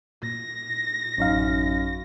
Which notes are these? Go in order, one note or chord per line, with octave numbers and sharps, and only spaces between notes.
A#2 A#6
A1 F#2 D#4 F5